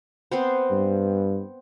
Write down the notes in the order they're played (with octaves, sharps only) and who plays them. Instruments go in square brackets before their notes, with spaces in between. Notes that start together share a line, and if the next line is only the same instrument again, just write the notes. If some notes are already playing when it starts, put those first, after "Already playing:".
[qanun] B3 C4 C5
[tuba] G2